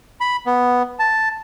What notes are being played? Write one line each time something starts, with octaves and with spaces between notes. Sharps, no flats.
B5
B3
A5